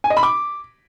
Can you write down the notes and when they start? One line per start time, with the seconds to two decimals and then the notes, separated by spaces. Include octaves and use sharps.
0.04 G#5
0.10 D#5
0.17 B5
0.23 D6